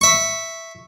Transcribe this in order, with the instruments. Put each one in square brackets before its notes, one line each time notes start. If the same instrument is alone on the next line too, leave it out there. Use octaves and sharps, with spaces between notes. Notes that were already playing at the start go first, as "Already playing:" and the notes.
[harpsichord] E5 C#6